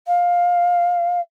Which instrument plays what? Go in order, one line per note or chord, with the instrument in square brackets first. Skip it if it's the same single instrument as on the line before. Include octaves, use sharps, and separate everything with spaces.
[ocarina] F5